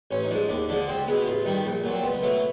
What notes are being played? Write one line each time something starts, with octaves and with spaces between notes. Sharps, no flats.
A1 C#4
D#4
G#2 F3 D4
D#2 D4
D3 F3 G#3 D4
C#2 C4
B2 G#3 B3
A1 F4
G2 D#3 G3
A#1
A#2 F#3
C4
C#2 B3
B2 F#3 A3